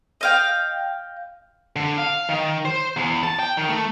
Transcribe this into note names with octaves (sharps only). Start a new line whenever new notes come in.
D#5 F5 G5
D3
F5
D#3
C5
E2
A5
G5
D#3
A3